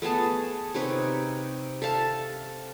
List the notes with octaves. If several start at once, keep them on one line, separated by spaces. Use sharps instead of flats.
A3 B3 G#4 A5
C3 D#4 B4 C#5
A4 E5 F5 A5